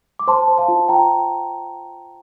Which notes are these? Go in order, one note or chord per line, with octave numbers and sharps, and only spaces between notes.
D6
C5 A5 C6
C5
F5 A5
F4
F4 G5 A#5